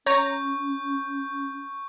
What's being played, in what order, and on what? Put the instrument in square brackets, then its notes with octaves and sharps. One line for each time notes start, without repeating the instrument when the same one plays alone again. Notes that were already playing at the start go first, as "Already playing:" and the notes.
[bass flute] C#4 [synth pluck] C#5 A#5 [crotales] C#6 G6